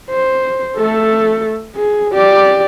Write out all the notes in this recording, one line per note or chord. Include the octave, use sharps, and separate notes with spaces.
C5
A3 A4
G#4
G4 D5